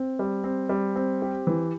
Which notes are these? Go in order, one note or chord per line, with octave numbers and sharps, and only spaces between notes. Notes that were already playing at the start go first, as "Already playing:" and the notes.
Already playing: C4
G3
C4
G3
C4
G4
E3